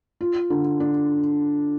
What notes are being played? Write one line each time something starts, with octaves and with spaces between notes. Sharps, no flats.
F4
D3
D4